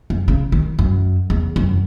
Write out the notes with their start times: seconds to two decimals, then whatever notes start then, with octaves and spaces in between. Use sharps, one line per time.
0.10 F#2
0.28 C#3
0.52 D#3
0.79 F#2
1.30 E2
1.56 F#2